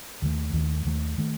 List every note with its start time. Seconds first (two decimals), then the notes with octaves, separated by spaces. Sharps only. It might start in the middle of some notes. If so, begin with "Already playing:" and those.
0.22 D#2 D#3 A3
0.53 D#2 D#3 A3
0.85 D#2 D#3 A3
1.18 D#3 A3